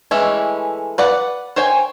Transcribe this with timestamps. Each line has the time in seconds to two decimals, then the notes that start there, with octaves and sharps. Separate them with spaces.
0.11 E3 G#3 A3 C#4 E4
0.98 B4 D5 F#5
1.56 C5 C#5 G5 G#5